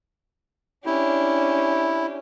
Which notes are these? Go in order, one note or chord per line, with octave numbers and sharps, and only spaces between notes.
C#4 D4 E4 G4